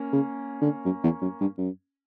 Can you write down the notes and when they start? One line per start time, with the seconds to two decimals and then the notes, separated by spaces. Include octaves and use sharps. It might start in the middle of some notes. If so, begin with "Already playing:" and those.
Already playing: A#3 C#4
0.12 C#3
0.61 D3
0.85 F#2
1.03 E2
1.22 F#2
1.40 G2
1.58 F#2